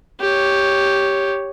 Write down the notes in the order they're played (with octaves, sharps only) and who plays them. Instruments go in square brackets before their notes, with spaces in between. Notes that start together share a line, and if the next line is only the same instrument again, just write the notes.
[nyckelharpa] G4 C#5